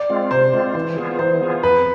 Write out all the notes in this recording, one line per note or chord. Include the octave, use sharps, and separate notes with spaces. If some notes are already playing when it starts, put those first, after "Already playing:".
Already playing: D5
G#3 C4 F4
C3 C5
G#3 C4 F4
E3
B3 F4 G#4
E3 C5
B3 F4 G#4
F2 B4